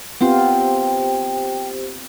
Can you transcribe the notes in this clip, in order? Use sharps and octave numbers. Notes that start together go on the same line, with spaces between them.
B3 C4 F4 G4 C5 G5